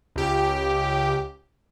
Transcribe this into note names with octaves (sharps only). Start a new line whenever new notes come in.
C#2 G4